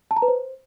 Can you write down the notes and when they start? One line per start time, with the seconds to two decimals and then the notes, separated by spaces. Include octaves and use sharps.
0.11 A5
0.17 A#5
0.22 B4
0.28 C5